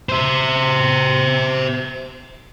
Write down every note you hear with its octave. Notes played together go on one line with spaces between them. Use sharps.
C5 E5